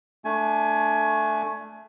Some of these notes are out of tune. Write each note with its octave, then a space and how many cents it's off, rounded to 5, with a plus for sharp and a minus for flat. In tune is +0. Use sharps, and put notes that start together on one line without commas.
A3 +0 D4 +0 G#5 +20